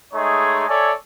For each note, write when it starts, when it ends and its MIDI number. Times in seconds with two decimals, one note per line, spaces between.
0.14 0.67 56
0.14 0.67 57
0.14 0.67 63
0.14 0.67 68
0.14 0.67 73
0.68 0.92 69
0.68 0.92 73
0.68 0.92 74
0.68 0.92 76
0.68 0.92 80